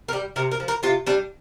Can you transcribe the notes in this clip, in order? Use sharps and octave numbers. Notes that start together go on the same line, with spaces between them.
A#4
G3 G4
C3 A#4
A#4
F3
A#4
C3 F4
G3 D4